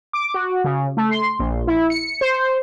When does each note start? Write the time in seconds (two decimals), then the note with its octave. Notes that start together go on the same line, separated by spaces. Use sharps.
0.13 D6
0.34 F#4
0.64 C#3
0.97 A3
1.11 C6
1.39 A#1
1.67 E4
1.90 C#7
2.21 C5